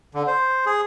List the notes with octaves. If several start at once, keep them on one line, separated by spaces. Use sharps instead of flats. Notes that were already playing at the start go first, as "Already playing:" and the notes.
D3
C5
G#4